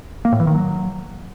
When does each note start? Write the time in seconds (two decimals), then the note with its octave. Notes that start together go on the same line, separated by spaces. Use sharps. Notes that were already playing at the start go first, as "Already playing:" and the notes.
0.25 A#3
0.32 A2
0.40 E3
0.47 D#3
0.55 F#3